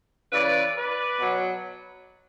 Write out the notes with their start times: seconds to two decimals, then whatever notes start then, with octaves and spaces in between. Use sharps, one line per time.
0.32 C#3 E3 B4 D5
0.76 B4 D5
1.19 B2 F#3